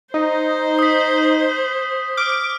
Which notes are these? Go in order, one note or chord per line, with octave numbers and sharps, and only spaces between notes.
D#4 C5
D#6 B6
D6 F6